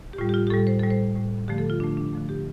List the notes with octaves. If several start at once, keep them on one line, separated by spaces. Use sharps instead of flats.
G4
A2 G3 F4
G4
F4
G4
A2 G3 A4
C5
A2 G3 A4
C5
A2 G3
D3 F3 A3 G4
A4
F4
D3 F3 A3 D4
D4
D3 F3 A3
G4